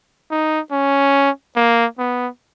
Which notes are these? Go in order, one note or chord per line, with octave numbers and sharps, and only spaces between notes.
D#4
C#4
A#3
B3